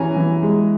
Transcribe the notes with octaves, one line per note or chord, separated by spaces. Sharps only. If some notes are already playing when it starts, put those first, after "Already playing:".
Already playing: E3 C#4 G#5 A#5
E3
G#3